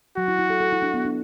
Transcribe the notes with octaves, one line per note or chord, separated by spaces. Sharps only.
F#3 F#4
E4
E4
A4
A4
E4
D4
B3
D4